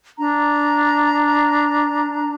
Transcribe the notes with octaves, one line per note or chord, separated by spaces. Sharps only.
D4 A#5